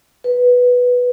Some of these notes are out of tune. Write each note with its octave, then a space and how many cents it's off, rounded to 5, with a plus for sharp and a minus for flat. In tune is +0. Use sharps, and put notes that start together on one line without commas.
B4 +0